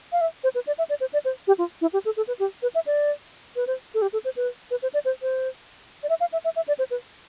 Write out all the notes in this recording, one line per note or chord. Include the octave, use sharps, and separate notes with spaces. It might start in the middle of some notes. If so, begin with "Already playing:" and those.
F5
E5
C5
B4
D5
E5
D5
C5
D5
C5
G4
F4
E4
G4
A4
A4
B4
G4
B4
E5
D5
B4
C5
A4
G4
A4
C5
B4
B4
C5
D5
C5
C5
D5
E5
F5
E5
E5
E5
D5
C5
B4